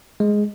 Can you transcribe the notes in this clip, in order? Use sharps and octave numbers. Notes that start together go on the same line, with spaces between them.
G#3